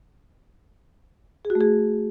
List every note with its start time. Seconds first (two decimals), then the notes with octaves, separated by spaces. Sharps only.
1.45 G#4
1.50 F#4
1.55 A3
1.61 G#4